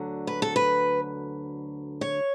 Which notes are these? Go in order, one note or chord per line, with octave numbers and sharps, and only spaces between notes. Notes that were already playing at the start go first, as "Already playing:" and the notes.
Already playing: D2 D3 F#3
B4
A4
B4
C#5